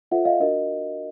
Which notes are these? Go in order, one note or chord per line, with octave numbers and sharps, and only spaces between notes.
F4 A4 C5 E5 F#5
D#5 F5
D4 F#4 A#4 D#5